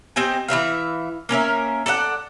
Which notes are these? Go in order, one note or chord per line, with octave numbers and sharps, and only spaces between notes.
C4 G4 D#5 G#5
E3 F#3 E5 F5
A#3 C#4 A#4 E5
A4 D5 D#5 F#5